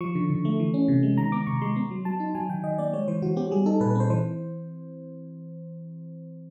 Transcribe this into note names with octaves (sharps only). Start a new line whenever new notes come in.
F3 C#6
D3
D3
A3
E3
C#4
C3
G#3
D#3 A#5
B3 D6
C3 C#6
G#3 C6
B3
F#3
F#3 A5
D#4
F#3 G#5
D#3 G5
D#3 D#5
A#3 D5
G#3 C#5
E3 C5
E3 F#4
B3 G4
G3 G#4
D#4 A4
A#2 B4
B4
C4 C5
E3 C5